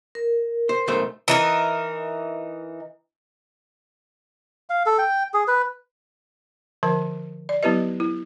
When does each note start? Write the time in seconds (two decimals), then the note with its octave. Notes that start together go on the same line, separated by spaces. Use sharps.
0.15 A#4
0.69 C5
0.87 B1 A3 C5
1.28 E3 D#4 A#4
4.70 F5
4.86 A4
4.99 G5
5.34 G#4
5.48 B4
6.83 D3 F3 A#4 A5
7.49 D5
7.63 F#3 B3 E4 G4 B4 D#5
8.00 E4